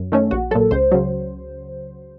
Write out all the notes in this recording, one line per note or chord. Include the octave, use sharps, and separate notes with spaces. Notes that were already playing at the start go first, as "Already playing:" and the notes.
Already playing: F#2
D#3 A3 C#4
A#1 F#4
A#2 F#3 A4
C#2 C5
C#3 F#3